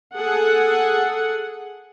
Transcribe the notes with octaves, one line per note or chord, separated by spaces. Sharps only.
G#4 A4 F#5